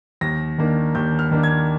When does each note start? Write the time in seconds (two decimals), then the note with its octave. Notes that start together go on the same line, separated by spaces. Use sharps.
0.21 D#2 A#6
0.58 D#3 A#3 D4
0.95 D#2 G6
1.19 F6
1.31 D#3 A#3 D4
1.43 G#6